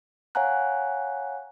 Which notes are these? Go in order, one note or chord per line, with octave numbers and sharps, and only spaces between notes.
C#5 F5 F#5 G#5 A#5 F#6